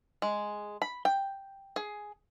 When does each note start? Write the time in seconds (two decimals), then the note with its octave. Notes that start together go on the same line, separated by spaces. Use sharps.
0.22 G#3
0.82 B5
1.05 G5
1.76 G#4